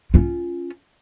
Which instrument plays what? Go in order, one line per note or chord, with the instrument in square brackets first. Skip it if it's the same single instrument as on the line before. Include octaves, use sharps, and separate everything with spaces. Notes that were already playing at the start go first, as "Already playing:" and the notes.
[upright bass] C#4 F4